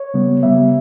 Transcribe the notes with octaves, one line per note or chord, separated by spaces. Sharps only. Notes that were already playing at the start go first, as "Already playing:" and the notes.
Already playing: C#5
C#3 G3 B3
C#3 G3 B3 E5